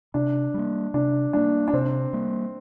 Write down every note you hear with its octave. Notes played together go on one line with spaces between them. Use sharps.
C3 D4
G3 A#3
C3 D4
G3 A#3 D4
D4
C3 C4
G3 A#3